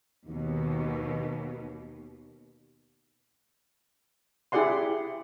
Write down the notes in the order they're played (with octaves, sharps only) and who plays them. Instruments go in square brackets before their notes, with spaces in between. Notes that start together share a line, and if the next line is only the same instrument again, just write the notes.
[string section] D#2 B2
[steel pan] E4 G4 G#4 D5 F#5 C6